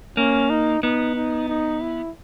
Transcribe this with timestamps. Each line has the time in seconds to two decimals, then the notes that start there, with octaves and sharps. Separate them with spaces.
0.17 A#3 C#4
0.50 D#4
0.83 B3 D#4
1.15 D#4
1.48 D#4
1.81 E4